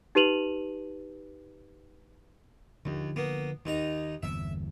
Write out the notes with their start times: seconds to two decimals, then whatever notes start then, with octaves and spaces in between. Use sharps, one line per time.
0.15 D#4 G4 B4 D#7 F7 F#7
2.85 D#2 D3 F3
3.16 A#3 B3
3.65 D#2 D#3 D#4 A#5
4.23 G1 E2 C3 E5